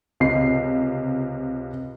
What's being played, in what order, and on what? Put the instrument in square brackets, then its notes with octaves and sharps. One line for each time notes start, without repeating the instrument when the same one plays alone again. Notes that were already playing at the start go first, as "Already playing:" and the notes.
[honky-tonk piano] C#2 C3 C7